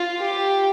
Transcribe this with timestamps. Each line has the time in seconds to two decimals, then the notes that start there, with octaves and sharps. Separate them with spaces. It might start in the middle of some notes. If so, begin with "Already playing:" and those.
Already playing: F4
0.20 G4